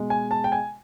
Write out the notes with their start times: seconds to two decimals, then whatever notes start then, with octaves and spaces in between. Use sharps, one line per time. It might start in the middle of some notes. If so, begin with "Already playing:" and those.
Already playing: B2 G#3
0.10 G#5
0.31 A5
0.44 G5
0.52 G#5